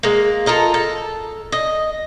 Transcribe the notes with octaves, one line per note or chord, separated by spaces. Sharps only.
G#3 A#3
F4 A4 A#4 D#5
A4
D#5